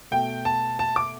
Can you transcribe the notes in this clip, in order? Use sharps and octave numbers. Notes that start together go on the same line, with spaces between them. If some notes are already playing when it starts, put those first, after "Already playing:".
B2 A3 G5
A5
A5
D6